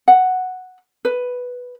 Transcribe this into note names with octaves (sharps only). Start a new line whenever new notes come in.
F#5
B4